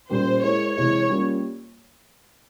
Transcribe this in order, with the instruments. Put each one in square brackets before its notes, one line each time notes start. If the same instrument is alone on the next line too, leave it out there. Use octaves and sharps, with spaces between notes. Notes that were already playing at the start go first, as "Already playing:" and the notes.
[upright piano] A#2 G3 C#4 G4 A#4 [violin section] C5
[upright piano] G#3 E4 A#4 [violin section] C#5
[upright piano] C3 E3 G#3 E4 [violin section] C#5
[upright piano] G3 A#3 C#4 F4